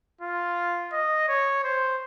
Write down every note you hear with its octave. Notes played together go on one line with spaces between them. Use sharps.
F4
D#5
C#5
C5